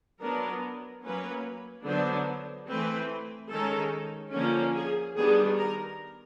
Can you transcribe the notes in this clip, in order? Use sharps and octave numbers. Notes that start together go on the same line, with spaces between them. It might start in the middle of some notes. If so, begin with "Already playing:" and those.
F#3 B3 D4 A#4
F#3 A#3 C#4 B4
D3 F#3 B3 D4 C5
E3 A3 C4 B4
D#3 G#3 C#4 A4
D3 F3 A#3 C#4
G#4
D#3 G3 B3 D4 G#4
A#4